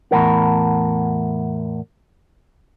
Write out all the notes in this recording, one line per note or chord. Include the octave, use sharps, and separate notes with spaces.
E2 A2 G#3 A#4 F#5